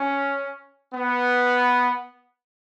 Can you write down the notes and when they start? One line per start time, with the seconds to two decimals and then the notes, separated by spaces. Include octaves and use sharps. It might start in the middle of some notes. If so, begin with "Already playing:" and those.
Already playing: C#4
0.94 B3